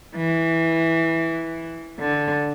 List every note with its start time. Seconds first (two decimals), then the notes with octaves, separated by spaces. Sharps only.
0.17 E3
2.01 D3